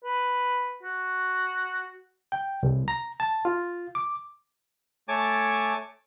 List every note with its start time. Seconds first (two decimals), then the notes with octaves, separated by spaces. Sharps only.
0.04 B4
0.83 F#4
2.32 G5
2.63 C2
2.88 A#5
3.20 A5
3.45 F4
3.95 D6
5.08 A3 C#5 G#5 A5 D6